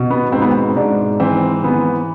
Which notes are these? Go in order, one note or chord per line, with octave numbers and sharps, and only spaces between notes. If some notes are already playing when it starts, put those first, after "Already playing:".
Already playing: B2
B3
G#2 C4
B3
C4
G#2 D4
E3 C4
E3 B3